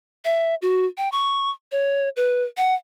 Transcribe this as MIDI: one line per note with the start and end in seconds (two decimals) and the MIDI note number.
0.25 0.55 76
0.62 0.86 66
0.98 1.11 79
1.12 1.51 85
1.72 2.09 73
2.16 2.44 71
2.57 2.74 78